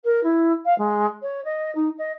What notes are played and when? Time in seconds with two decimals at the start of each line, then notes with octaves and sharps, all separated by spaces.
0.04 A#4
0.23 E4
0.65 F5
0.78 G#3
1.22 C#5
1.44 D#5
1.75 D#4
1.98 D#5